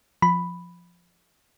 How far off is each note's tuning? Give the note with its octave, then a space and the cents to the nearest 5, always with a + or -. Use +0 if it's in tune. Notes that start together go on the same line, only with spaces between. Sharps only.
F3 +0 B5 +0